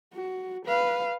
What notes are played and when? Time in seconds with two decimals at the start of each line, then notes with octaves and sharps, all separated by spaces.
0.14 F#4
0.66 B4 F5